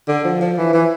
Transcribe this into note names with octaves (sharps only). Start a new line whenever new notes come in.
D3
F3
F3
E3
E3